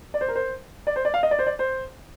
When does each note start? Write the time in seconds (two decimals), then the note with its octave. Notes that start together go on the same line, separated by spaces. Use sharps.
0.14 D5
0.21 C5
0.28 A#4
0.35 C5
0.87 D5
0.96 C5
1.05 D5
1.14 F5
1.23 D#5
1.31 D5
1.39 C5
1.47 D5
1.59 C5